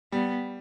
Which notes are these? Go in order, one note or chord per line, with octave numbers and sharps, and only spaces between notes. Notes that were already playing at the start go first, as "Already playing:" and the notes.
G3 B3